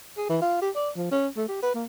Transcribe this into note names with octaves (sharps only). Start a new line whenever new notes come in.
G#4
E3
F4
G4
D5
F3
C#4
A3
G4
B4
A#3